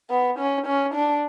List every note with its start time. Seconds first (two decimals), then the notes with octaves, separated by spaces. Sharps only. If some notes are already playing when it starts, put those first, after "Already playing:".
0.10 B3
0.39 C#4
0.66 C#4
0.94 D4